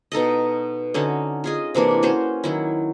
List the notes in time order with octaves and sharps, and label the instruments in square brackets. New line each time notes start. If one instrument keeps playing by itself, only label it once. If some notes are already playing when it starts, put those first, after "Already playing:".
[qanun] B2 D#4 A4 D#5
D3 C#4 D#4 F#4
F4 G#4 D#5
C3 E3 A#3 D4
C#4 F#4 C5
D#3 F#3 E4